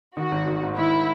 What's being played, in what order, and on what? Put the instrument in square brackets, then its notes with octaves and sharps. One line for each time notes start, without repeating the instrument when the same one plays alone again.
[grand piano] D#3 [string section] F#4
[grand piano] G#1
D#3
G#2
[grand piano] D#3 [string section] E4